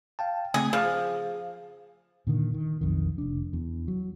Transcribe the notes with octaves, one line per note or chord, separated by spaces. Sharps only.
F5 G5 A5
C#3 A3 C4 G#4
F3 G#4 C5
A#2 D3 D#3
D#3
B1 F2 D#3
F1 D4
E2
F#3